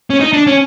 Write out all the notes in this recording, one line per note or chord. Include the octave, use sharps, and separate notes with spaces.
C#4
D#4
D4
C#4